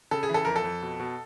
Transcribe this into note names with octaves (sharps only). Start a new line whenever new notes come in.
C#3 A4
G#4
E3
A4
F2 A#4
A4
F2
B2
B2